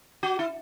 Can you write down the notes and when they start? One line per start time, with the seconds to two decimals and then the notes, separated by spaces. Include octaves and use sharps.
0.23 F#4
0.39 E4